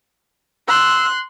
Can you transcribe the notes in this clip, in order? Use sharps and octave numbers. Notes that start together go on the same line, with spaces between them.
C6 E6 F#6